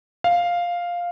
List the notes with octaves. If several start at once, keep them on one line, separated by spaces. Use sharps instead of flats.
F5